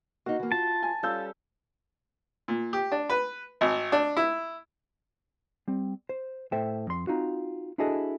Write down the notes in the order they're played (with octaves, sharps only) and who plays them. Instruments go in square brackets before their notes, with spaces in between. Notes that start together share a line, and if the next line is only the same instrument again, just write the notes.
[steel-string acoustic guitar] A#3 D#4 [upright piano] F#4
[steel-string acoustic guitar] E3 A#3
[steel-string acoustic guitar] F4 [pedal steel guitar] A5
[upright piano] G#5
[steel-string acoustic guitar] G3 C#4 A4 [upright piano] F4 E6 G6
[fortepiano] A#2
G4
D4
B4
G#1
D4
E4
[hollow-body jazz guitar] G3 C4
C5
A2 A4 C5 E5 G5
F2 C6
C4 D#4 F4 F#4
D4 E4 F#4 G#4 A4 D#5